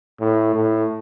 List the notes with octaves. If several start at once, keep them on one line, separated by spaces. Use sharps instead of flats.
A2
A2